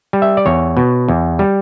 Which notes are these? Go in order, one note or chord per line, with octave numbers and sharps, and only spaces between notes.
G3
E5
D5
E2 C#5
B2
E2
G3